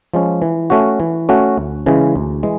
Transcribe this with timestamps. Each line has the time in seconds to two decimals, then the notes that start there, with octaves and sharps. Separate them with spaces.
0.14 F3 G#3 C#4
0.42 E3
0.70 A3 C#4 F#4
1.00 E3
1.29 A3 C#4 F#4
1.57 D2
1.86 C#3 E3 G#3 C#4
2.16 D2
2.43 E3 G#3